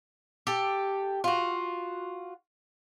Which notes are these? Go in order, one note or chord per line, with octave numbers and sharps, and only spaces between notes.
G4 A4
F4 F#4